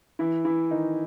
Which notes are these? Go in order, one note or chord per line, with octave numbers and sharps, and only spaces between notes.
E3 E4
E3 E4
D#3 D#4